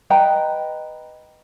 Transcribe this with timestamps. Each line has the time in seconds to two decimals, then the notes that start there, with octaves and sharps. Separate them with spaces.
0.10 B4 D#5 G5 A#5